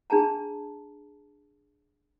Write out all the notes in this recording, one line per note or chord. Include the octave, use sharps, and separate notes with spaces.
D4 G#4 A5 A#5